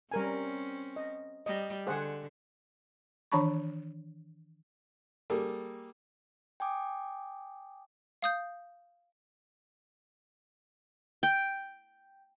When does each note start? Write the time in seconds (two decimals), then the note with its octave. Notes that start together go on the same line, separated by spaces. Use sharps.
0.12 G3 C4 C#4 A#4 G#5
0.96 D#5
1.46 G3 D#5
1.87 D3 G#4 C5 F#5
3.32 D#3 E3 D4 A5 B5 C#6
5.30 G3 A#3 G#4 A4
6.60 G5 G#5 D6 D#6
8.22 F5 D#6 G6
11.23 G5